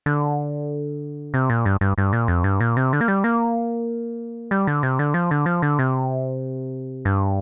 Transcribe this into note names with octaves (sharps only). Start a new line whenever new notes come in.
D3
C3
A#2
G2
G2
G2
A#2
F2
G2
A#2
C3
D3
A#3
G3
A#3
G3
D3
C3
D3
F3
D3
F3
D3
C3
G2